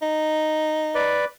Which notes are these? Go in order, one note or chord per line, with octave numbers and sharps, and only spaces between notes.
D#4
B4 D5